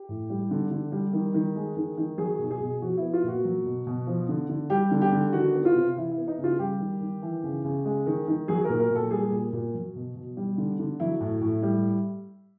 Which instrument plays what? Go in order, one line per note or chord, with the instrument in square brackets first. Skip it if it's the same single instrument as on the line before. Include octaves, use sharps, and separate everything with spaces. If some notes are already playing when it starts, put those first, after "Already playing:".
Already playing: [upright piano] G4
A2
G3
D3
D3
G3
D#3
D#3
G#3
D#3
D#3
F#3 G#4
B2
G#4
B2
F3 F#4
B3 E4
F4
A#2 F#4
F#3
B2
B2
F3
D3
D3
G3 G4
D3
G4
D3
D#3 F#4
B3
F4
C3
E3 E4
E4
B3
D#4
C#3
F4
G3 G4
D#3
D#3
E3
C#3
C#3
G#3
D#3
D#3
F#3 G#4
A#4
A#2
A#4
A#2
A4
G3 G#4
A#2
A#2
F#3
B2
B2
G3
D3
D3
F#3 E4
A2
A2
G3